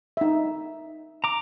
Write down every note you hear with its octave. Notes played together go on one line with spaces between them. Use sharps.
D#4 E5
A#5 D6